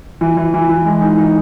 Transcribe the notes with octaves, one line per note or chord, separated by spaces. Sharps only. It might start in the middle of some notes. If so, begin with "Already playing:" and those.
E3
E3
E3
E3
G#3
D#4
D#4